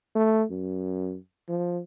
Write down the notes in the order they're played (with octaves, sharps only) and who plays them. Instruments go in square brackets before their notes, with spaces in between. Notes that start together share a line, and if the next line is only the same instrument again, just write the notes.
[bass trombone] A3
F#2
F3